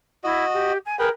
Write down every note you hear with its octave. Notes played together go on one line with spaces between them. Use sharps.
E4 F#4 D#5
G4
G#5
G#4 A#4 B4 G5